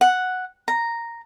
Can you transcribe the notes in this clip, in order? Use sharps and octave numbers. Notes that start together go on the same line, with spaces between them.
F#5
A#5